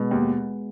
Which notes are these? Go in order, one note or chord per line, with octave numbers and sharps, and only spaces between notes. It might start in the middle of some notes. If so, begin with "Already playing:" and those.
Already playing: B2 G#3 B3
D#2